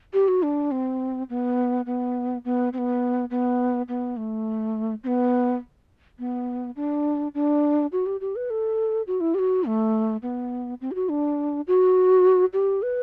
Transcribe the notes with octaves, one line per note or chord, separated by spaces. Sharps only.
G4
F#4
D4
C4
B3
B3
B3
C4
B3
B3
B3
A3
C4
B3
B3
D4
D4
F#4
G4
G4
B4
A4
F#4
E4
G4
F#4
A3
B3
C4
G4
F#4
D4
F#4
G4
B4